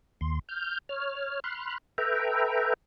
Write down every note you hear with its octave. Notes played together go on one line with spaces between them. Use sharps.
D#2 C6
F6 G6
C#5 F6
B5 C6 F6 F#6
A4 B4 E5 G5 A#5